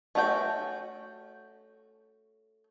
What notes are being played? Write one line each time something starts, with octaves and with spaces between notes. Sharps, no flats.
A3 C#4 F#4 G#4 G5